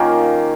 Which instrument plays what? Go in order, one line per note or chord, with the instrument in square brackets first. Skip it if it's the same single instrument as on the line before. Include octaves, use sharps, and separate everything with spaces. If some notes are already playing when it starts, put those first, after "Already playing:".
Already playing: [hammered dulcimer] D#3 A#3 C#4 F4